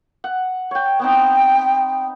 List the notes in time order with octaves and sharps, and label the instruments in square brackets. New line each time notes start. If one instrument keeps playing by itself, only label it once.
[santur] F#5
C#5 G5
[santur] B3 C4 D#4 [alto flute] G5